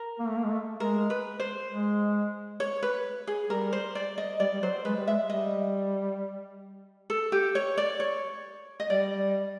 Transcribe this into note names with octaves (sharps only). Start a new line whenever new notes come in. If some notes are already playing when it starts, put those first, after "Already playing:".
Already playing: A#4
A#3
A3
A#3
G#3
A3
G#3 A#4
B4
C5
G#3
C#5
B4
G#4
G3 A#4
C5
D5
D#5
G3 D5
G3
F#3 C5
G#3 B4
G3
G#3 E5
G3 D#5
A4
G4
C#5
D5
C#5
D#5
G3 D5